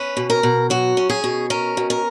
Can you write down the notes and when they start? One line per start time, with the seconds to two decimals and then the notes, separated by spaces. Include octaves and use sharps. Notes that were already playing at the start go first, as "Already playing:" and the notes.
Already playing: C#4 B4
0.17 B2
0.30 A#4
0.43 B2
0.70 F#3 F#4
0.97 C#4
1.10 G#4
1.24 B2
1.50 C#4 A#4
1.77 B2
1.90 A#4